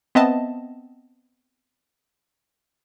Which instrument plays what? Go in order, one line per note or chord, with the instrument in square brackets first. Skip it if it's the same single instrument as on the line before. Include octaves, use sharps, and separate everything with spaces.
[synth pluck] B3 C4 D#5 E5 A5